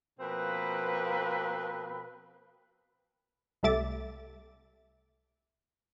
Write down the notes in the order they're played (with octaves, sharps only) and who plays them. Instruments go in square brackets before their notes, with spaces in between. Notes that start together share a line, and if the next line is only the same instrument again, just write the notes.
[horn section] B2 F3 A#3 C4 B4
[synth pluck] C2 G3 A3 E5 D6 A6